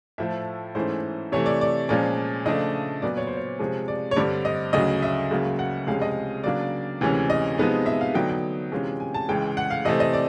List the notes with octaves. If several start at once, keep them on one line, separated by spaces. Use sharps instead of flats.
A2 F3 A3 E5
G#2 E3 A3 C#4 E4 C5
C3 E3 A3 C#5
D5
D5
A#2 F3 G#3 C#4 D5
C#3 F3 A3 D4 D#5
A#2 F#3 B3 D5
C#5
C5
C#5
C3 F3 G#3
D5
C#5
G2 D3 G3 C4 D5
D#5
D2 C#3 F#3 D#5
E5
C#2 C#3 F#3 A#3
F#5
C#2 C3 F3 G#3 C#4 F5
D#5
C#3 F#3 A#3 D4 D5
D2 C3 E3 G#3 C#4
D#5
C3 F3 G#3 B3 D#4
E5
F5
D3 F#3 B3 D#4 G5
G5
C3 E3 G#3 C#4 F4
G#5
A5
C#2 C#3 E3 G#3 G5
F#5
F5
C3 E3 A3 C4 D#5
D#5
D5